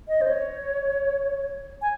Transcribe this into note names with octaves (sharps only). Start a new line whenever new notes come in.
D#5
C5
C#5
G#5